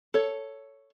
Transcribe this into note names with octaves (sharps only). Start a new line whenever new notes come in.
A4 C#5